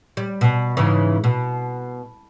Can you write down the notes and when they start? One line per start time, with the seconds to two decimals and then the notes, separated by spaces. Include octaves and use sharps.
0.17 G3
0.41 B2
0.77 G#2 C#3 E3
1.24 B2